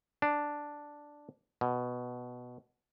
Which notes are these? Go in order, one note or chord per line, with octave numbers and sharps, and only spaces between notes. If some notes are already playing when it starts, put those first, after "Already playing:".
D4
B2